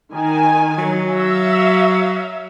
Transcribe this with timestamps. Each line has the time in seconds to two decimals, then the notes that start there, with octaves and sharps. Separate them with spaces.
0.12 D#3 G#5
0.78 F#3
1.11 E5 F5